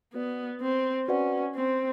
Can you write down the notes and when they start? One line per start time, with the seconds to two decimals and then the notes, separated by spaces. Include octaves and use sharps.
0.14 B3 F#4 B4 D5 F#5
0.61 C4
1.08 C#4 F#4 B4 D5 F#5
1.55 C4